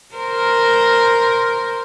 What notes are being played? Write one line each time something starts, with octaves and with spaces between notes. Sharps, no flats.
A#4 C5